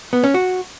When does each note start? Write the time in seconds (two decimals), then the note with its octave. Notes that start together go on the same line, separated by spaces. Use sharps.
0.13 B3
0.24 C#4
0.34 F#4